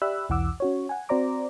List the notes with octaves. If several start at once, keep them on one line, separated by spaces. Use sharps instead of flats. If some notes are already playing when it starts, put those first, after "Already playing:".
G4 D5 E5 B5 E6 F#6
B1 E2 E3 F#5 D6 E6
C#4 F#4 C#5
F#5 G#5
C4 F#4 C5 D5 A#5 D6